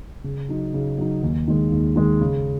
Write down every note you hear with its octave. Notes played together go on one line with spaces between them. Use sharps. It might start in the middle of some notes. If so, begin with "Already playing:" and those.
C#3
F#3 D#4
C#3
F#3 D#4
D#2
D#3 G#3
D#2
D#3 G#3
C#3